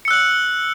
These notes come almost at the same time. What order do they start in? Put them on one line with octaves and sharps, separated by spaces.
C#7 E6 F#6 F#7